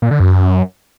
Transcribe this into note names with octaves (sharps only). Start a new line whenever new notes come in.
A#2
D3
F#2